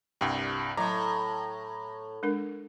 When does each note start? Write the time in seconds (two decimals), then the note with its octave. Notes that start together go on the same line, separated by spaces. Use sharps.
0.21 C2 G2 G5
0.77 A2 F#3 A#5
2.23 G#3 D4 A#4